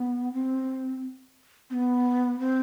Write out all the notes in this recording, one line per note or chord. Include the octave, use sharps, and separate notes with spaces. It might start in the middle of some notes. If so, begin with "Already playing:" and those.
Already playing: B3
C4
C4
B3
C4